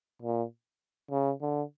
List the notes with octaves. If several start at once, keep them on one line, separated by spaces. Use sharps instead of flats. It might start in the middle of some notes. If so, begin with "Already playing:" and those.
A#2
C#3
D3